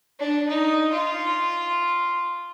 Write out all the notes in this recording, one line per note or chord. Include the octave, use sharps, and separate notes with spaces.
D4
D#4
F4